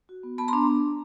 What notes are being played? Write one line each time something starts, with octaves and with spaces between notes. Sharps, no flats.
F#4
B3
B3 A5 B5
A#5 C6
D4